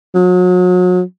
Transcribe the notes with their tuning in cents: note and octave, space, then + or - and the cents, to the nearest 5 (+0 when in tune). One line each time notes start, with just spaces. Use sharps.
F#3 -35